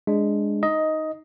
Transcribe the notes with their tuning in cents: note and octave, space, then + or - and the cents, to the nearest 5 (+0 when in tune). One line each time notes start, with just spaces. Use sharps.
G#3 -5 D4 +0
D#4 +0 D#5 +10